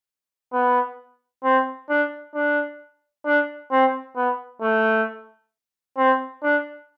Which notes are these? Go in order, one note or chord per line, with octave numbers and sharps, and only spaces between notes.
B3
C4
D4
D4
D4
C4
B3
A3
C4
D4